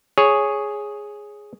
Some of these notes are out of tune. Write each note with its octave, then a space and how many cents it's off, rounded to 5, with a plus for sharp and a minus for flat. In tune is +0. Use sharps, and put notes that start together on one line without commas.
G#4 +0 C#5 +0